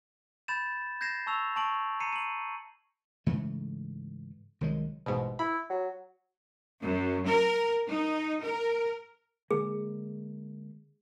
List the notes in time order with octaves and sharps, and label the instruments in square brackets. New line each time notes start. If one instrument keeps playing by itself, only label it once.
[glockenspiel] B5 G6 A6 E7
G6 G#6 A#6 C7 E7
A5 C#6 E6 F7
A5 C#6 D7 F#7
A#5 C7 C#7 D#7
D#7 F#7
[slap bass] G#2 C#3 E3 A3
C2 D#3 F#3 G#3
[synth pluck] A1 G#2 B2
[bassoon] E4 [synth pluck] B5
[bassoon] F#3
[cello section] F#2
A#4
D#4
A#4
[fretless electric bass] D3 G#3 A#3 [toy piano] G#4